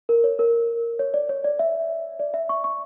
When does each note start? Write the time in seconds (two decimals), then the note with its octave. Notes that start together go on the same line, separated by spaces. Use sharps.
0.09 A#4
0.24 C#5
0.39 A#4
0.99 C#5
1.14 D5
1.29 C#5
1.44 D5
1.59 E5
2.19 D5
2.34 E5
2.49 C#6
2.64 C#6